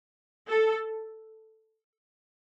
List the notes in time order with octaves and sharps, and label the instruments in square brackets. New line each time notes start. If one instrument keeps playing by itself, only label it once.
[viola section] A4